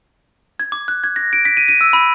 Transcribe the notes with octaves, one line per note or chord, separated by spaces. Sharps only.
G#6
D6
F#6
G#6
A#6
D7
B6
D#7
D#7
E6
B5